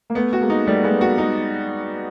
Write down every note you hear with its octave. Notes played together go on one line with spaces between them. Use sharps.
A#3
A3 B3
F#4
G#3 A#3
D#4
G3 A3 B3
G#3 A#3 B3
G#3 F#4
G#3 D#4